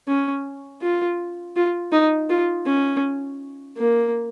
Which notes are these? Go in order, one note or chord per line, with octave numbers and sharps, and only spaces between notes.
C#4
F4
F4
D#4
F4
C#4
A#3